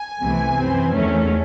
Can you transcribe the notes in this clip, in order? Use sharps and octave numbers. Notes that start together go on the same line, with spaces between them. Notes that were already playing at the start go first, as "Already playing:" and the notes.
Already playing: G#5
C2 C3 E3 A3
F#2 E3 C4
E2 D#3 A3 C#4